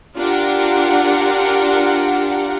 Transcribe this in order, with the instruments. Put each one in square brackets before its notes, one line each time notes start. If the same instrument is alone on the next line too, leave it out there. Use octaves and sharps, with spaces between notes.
[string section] D4 F4 G4 A#4 F#5